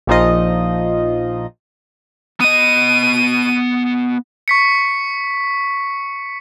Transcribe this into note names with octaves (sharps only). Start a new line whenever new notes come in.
A#1 A#2 F3 D#4 F4 D#5
B3 D#5 D#7
C#6 B6 C#7